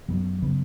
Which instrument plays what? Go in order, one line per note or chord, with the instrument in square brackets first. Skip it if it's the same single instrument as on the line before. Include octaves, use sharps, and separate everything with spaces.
[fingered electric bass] F#2 F#3 B3
C#3 F#3 B3